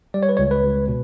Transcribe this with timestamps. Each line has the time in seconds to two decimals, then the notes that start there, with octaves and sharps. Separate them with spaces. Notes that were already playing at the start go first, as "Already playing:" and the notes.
0.14 G3 D5
0.23 C#5
0.29 B4
0.37 C#2 C#5
0.51 B4
0.64 C#2
0.88 B2